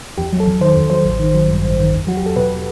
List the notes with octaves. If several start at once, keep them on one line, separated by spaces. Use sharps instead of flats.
E2 G4
F#3
A4
E2
D#3 C5
E2
F#3 C5
A1
D#3
F#3
G2
A1
D#3
E2
F#3 F#4
G4
E2 A4
B2 B4